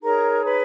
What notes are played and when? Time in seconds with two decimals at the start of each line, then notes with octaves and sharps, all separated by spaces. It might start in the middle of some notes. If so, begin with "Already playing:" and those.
0.03 D#4 G#4 A#4 C#5 A#5
0.46 B4 B5